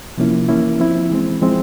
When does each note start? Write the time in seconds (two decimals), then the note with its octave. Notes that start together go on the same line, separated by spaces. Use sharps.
0.18 C3 F3 A#3 C#4 E4
0.49 E3 A#3 C#4 E4
0.80 F3 C4 E4
1.11 E3 G#3 C4
1.41 F3 G#3 C4 E4